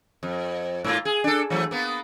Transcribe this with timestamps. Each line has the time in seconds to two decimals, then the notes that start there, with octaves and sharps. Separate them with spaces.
0.23 F2
0.84 G#2 A#3 F4
1.05 G#4
1.24 D4 A4
1.50 E3 F#3 A3
1.71 A#3 B3